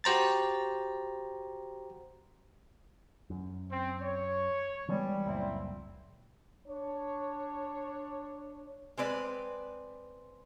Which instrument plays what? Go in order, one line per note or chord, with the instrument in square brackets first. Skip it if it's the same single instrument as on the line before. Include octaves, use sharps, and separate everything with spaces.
[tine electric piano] F#4 G4 C5 A#5 A6
[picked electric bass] F#2
[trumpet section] C4
C#5
[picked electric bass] E3 G#3 B3 [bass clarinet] G3
[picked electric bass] C#2 F#2 A#2 [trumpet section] C4 E4
[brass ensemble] D4 C#5
[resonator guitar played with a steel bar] G#3 C4 B4 D5